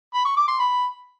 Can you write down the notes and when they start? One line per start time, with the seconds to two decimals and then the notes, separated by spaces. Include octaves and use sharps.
0.14 B5
0.25 C#6
0.36 D6
0.48 C6
0.59 B5